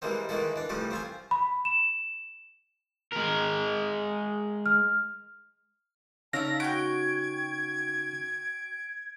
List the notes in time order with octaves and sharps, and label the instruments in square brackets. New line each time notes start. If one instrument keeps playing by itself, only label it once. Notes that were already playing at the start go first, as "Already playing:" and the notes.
[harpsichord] E3 G3 G#3 A#3 C4
D#3 E3 G#3 A#3 E4 A4
E3 D4
C2 E3 F3 G3 A3 D6
C4 F4 G#5
[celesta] B5
E7
[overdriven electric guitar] G#3 A#4
[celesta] F6
[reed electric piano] C#3 C#4 D#4 [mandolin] D5 E5 F5 [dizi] A5 [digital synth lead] A#6
[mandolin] F#4 G5 [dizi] G#6 [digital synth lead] D7